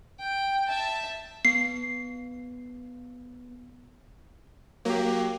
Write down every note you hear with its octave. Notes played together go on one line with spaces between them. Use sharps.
G5
E5 A5
B3 C7
F#3 A#3 G4